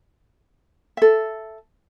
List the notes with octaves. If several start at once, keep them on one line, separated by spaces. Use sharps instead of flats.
A4 E5